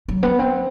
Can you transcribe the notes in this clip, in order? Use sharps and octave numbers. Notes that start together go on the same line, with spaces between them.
F#3
B3
C4